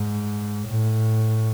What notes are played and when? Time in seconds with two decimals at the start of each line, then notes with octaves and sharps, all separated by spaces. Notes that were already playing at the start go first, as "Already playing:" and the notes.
Already playing: G#2
0.68 A2